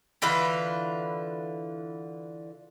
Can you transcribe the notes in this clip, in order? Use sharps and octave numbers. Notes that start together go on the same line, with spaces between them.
D3 E3 F4 B4